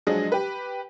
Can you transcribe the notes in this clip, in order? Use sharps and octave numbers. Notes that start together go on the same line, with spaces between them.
F3 F#3 G#3 D4 G#4 D#5
G4 B4